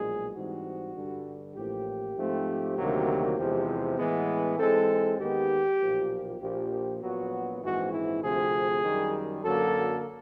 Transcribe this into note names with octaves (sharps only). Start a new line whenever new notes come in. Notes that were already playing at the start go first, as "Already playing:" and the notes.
Already playing: B1 A#2 F3 G#3 G#4
G#2 E3 G3 C4 F#4
G2 D3 G3
A1 A2 F3 A#3 G4
G#2 F3 A3 C4
D2 C3 D#3 F#3 A#3
E2 C3 F3 G#3
A2 E3 G#3 B3
G#2 E3 G#3 C4 A4
D#2 D#3 G#3 B3 G4
B1 A#2 F3 A#3
A#1 A#2 F3 G4
A#1 A#2 F#3 B3 F#4
A#1 G#2 E3 G#3 C4 F#4
E4
D2 C3 F3 A3 C4 G#4
F#2 D#3 G3
F#2 D3 F#3 A#3 A4